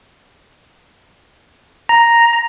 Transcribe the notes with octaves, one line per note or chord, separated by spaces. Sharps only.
A#5